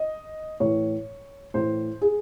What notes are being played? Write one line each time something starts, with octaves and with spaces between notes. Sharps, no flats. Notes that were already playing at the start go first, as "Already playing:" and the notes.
Already playing: D#5
A2 E3 C#5
A2 E3 C5
G#4